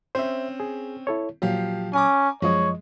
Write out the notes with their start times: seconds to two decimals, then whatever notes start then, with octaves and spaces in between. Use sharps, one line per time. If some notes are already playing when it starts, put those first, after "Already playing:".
0.15 C4 C#4 C5 E5
0.60 G#4
1.07 E4 A4 C#5
1.42 A#2 F3 F#3 G4 F5
1.93 C#4 G#5 A#5 D6
2.42 F#2 F3 G#3 C#5 D#5